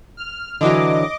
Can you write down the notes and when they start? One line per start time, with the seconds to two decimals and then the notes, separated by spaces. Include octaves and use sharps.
0.17 F6
0.61 D3 E3 F#3 D#5 D6